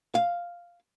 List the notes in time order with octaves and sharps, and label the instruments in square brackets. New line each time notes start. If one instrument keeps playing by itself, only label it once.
[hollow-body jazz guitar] F5